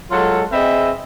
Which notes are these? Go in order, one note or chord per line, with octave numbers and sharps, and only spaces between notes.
F#3 G#3 F4 A4
C4 G#4 B4 D#5 E5